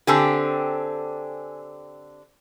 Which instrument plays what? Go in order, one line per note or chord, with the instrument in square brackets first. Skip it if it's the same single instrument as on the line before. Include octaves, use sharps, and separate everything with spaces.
[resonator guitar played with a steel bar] D3 C4 G4 [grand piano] G#5 A5 E6